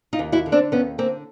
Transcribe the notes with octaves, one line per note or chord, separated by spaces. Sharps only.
D#4 F4
D#2
E4 F#4
D3
C4 D4
D#2 B3 C#4
D3 A#3 C4